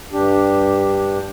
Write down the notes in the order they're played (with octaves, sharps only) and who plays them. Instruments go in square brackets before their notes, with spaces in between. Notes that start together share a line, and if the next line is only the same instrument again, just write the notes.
[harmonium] G2 D4 G4